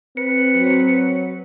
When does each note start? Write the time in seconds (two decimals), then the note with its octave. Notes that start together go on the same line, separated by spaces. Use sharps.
0.17 C4 B4 C#7
0.54 F#3